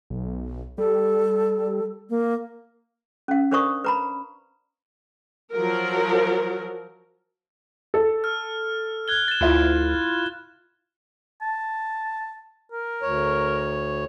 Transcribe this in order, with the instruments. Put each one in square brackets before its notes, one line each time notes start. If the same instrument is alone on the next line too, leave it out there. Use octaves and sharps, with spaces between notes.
[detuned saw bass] B1
[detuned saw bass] G3 [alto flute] A4
[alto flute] A#3
[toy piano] C#4 F5
D4 A#4 C5 D5 C#6 D#6
B4 A#5 B5
[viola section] F3 F#3 A#4
[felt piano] A4
[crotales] F6
F#6 G#6 G7
A6 E7
[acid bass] D2 [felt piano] E4 F4
[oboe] A5
A#4
[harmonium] D2 C#5